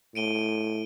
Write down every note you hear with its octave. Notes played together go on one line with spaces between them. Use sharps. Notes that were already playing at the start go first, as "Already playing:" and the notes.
A2 D7 D#7 G7